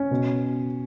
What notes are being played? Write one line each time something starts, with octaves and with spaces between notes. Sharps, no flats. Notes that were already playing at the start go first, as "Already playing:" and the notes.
Already playing: C#4
B2